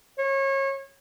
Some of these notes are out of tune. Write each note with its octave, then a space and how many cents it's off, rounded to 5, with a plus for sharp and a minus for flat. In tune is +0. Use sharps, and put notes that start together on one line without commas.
C#5 -30